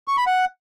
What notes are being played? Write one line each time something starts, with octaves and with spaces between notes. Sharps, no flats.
C#6
B5
F#5